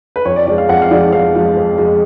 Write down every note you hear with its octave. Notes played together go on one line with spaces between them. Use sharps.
B4
F2 C#5
D5
F3 G#3 D5
F5
F2 F#5
F5
F3 G#3 D5
F2 F5
F3 G#3
F2
F3 G#3